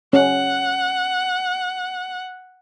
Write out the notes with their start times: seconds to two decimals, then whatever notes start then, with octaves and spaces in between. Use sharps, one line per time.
0.13 C#4 F#5